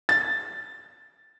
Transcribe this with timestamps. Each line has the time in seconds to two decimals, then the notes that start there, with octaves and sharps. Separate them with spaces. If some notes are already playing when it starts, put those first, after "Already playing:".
0.09 A6